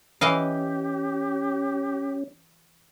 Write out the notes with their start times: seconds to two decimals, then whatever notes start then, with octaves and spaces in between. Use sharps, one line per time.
0.21 E3 C#4 G4 D#5 F5